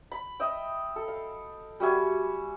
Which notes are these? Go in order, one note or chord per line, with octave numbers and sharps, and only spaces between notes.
B5
D#5 E5 G5
A4
F5
G3 F#4 E5 G#5